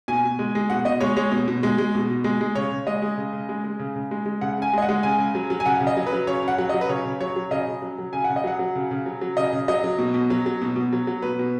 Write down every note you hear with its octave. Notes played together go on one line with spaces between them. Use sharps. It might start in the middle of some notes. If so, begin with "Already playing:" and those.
B2 G#5
B2
G#3
G#3
B2 F#5
B2 D#5
G#3 C#5
G#3 C#5
B2
B2
G#3
G#3
B2
B2
G#3
G#3
C#3 C#5
C#3
G#3 D#5
G#3
C#3
C#3
G#3
G#3
C#3
C#3
G#3
G#3
C#3 F#5
C#3 G#5
G#3 D#5
F#5
G#3
C#3 G#5
C#3
F#3
F#3
G#5
C#3 F#5
C#3
D#5
F#3
B4
F#3
C#3 C#5
C#3 F#5
F#3 F#5
F#3 D#5
B4
C#3 C#5
C#3
F#3 C#5
F#3
C#3 D#5
C#3
F#3
F#3
C#3 G#5
F#5
C#3
D#5
F#3 F#5
F#3
C#3
C#3
F#3
F#3
C#3 D#5
C#3
F#3 D#5
F#3
B2
B2
F#3
F#3
B2
B2
F#3
F#3
B2 B4
B2